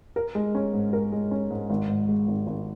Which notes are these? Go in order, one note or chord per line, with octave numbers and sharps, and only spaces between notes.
A#4
G#3
C#4
G#2
A#4
G#3
C#4
G#2
G#1
G#2
G#3
G#1
G#1